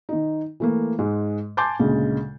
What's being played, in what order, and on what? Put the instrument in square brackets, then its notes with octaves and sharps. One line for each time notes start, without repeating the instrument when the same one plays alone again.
[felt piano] D#3 D#4
E3 A3 A#3
G#2 G#3
G#5 A5 C6 D6 G6 A6
D2 A#2 C#3 G#3